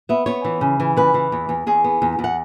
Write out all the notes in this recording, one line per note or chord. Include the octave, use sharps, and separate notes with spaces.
B3 E5
B3 C#5
E3
C#3
E3
C#3 B4
E3
E2
E2
E2 G#4
B3
E2
E2
F#5